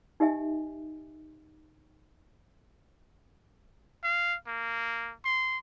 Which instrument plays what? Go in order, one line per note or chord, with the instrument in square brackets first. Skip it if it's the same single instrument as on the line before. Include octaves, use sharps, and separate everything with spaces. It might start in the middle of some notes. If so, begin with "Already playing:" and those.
[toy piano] D#4 G4 D#5 E5 G#5
[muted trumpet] F5
A#3
C6